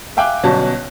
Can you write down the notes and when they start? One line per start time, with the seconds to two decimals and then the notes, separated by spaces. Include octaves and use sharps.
0.17 E5 F5 G5 G#5 D6 F#6
0.44 G1 B2 F#3 C#4 A5